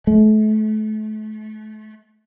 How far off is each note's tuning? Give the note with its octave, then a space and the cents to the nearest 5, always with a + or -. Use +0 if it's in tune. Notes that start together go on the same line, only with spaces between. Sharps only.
A3 -35